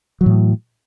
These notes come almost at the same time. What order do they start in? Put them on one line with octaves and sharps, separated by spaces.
F#3 E3 A2